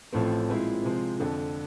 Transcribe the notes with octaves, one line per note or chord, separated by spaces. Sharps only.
A1 A2 F3 A3 C4
A#2 F3 G#3 C4 E4
C3 F3 G#3 C4
F2 D3 F3